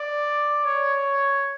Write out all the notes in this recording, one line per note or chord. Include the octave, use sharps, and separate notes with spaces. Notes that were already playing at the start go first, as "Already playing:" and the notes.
Already playing: D5
C#5